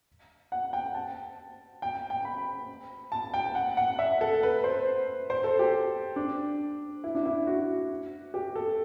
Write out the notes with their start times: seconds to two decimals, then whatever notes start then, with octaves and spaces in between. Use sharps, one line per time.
0.52 F#5
0.73 G5
0.94 A5
1.82 G5
2.10 G5
2.25 B5
3.12 A5
3.34 G5
3.55 F#5
3.77 F#5
3.99 E5
4.21 A4
4.43 B4
4.64 C5
5.30 C5
5.44 A4
5.59 G4
6.16 D4
7.04 E4
7.15 D4
7.26 E4
7.47 F#4
8.34 G4
8.56 A4